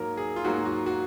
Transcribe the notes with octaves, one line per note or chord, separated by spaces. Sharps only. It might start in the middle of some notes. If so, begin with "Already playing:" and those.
Already playing: G#2 F#3 A#3 A#4
G#4
F4
G#2 F#3 A#3 F#4
F#4
F#4